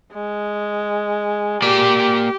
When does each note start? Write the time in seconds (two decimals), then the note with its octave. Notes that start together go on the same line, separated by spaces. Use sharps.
0.13 G#3
1.62 A#3 G4 D5